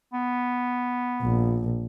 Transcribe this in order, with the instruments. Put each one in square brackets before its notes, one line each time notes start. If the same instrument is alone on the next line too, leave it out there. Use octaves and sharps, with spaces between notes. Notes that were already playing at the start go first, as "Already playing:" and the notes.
[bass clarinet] B3
[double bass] A#1